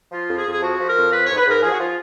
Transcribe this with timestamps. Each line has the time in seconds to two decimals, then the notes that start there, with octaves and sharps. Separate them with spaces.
0.11 F3 F4
0.28 F2
0.37 G#4
0.45 F2
0.52 G#4
0.61 F3 F#4
0.78 F3
0.87 A#4
0.96 F2
1.12 F3 B4
1.24 G#2 C#5
1.37 B4
1.45 G#2 A#4
1.62 F3 G#4
1.71 F#4
1.79 F3 F4